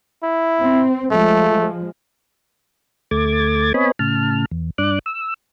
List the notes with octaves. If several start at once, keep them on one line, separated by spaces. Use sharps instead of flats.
E4
C4
F3 G#3 A3
D2 A3 D6 G#6 A6
B3 C4 C#5 D#5 G#5 B5
A2 C#3 A5 F6
E2
G2 D4 D6 F#6
E6